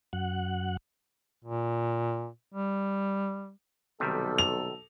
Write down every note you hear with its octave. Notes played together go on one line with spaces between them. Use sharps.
F#2 F#5
A#2
G3
B1 C3 D#3 G3 A4
F7